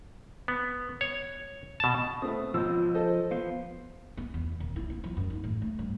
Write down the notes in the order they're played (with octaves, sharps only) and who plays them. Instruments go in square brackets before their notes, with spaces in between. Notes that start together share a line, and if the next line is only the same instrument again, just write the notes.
[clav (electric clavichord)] B3
C#5
B2 A5
[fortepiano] A3 B3 C4 [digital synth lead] D#6
[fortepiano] C#2 B2 E6 [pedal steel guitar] F3 G6 [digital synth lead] F4
[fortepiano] A4 D#5 [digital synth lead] C5
[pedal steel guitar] F3 B3 C5 [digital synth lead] F5
[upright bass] B3
E2
D#1
E4
B3
F3
F#2
D#4
A1
A3
G2